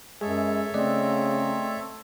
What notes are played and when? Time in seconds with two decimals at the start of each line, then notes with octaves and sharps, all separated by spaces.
0.21 F#2 G#3 G#4 A4 C#5 E5
0.74 C#3 A3 C4 D5 D#5